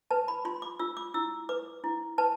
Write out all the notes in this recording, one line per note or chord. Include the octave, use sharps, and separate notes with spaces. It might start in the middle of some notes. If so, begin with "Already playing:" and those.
B4 A5
B5
F4 C6
D6
F4 E6
D6
E4 E6
B4 D6
E4
B4 A5